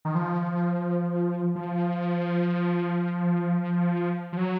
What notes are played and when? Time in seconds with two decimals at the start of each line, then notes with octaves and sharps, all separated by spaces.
0.05 D#3
0.15 F3
1.55 F3
4.33 F3
4.37 F#3